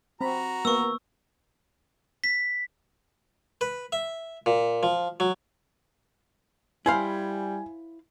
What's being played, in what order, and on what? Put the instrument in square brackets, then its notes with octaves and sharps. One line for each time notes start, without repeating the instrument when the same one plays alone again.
[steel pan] C4 B5 [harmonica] F#4 A#5
[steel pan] A#3 B3 [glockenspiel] C#6 E6
[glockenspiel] B6
[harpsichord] B4
E5
A#2
F3
F#3
[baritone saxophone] G3 [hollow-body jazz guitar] E4 C5 F5 [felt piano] G#5